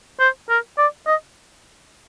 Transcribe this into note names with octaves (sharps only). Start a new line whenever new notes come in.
C5
A#4
D5
D#5